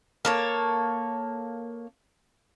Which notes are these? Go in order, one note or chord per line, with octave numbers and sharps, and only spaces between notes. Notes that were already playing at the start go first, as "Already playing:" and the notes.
A#3 A4 C#5